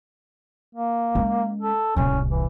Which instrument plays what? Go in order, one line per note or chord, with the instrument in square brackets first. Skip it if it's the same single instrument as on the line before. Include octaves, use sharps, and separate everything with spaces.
[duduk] A#3
[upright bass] G#3 C#4
[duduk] A4
[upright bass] D1 C2 [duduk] C#4
[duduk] E3